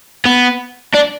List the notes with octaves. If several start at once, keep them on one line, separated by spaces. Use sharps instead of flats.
B3
D4